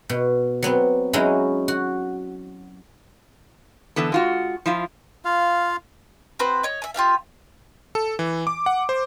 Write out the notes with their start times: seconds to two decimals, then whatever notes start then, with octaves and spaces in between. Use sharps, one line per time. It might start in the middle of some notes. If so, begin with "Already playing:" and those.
0.09 B2
0.63 F#3 B3 C4
1.13 F#3 G#3 C#4 D#4 E4 F#4
1.68 F#4
3.96 D3 E3 B3 A4
4.12 G#3 F4 F#4
4.66 F3 E4 F4
5.25 F4 F5
6.39 C4 F#4 B4 C5
6.63 C#5 D#5
6.82 E5 G#5
6.94 F4 G4 E5 F5
7.95 A4
8.19 E3
8.47 D6
8.66 F#5
8.89 C5